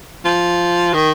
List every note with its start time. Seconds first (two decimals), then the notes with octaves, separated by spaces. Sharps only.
0.25 F3
0.94 D#3